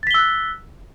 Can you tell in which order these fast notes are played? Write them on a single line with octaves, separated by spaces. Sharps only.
A6 B6 G7 E6 F#6